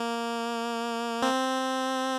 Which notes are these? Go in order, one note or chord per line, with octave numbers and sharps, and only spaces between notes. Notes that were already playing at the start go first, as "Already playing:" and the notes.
Already playing: A#3
C4